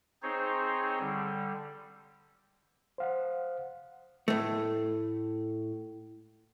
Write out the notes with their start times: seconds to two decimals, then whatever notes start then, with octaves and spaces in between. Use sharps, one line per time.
0.23 C4 D#4 G#4 C5 C#5
1.00 D3 G3
2.98 C5 F5 F#5
4.28 A2 A3